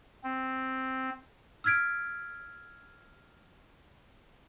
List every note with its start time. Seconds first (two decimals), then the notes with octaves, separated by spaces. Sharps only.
0.24 C4
1.64 E6 F6 G#6 B6 D7